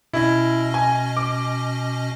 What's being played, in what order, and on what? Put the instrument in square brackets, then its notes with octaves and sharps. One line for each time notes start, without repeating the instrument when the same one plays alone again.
[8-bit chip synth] B2 C#4 D#5 [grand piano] E4
[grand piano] G#5
D6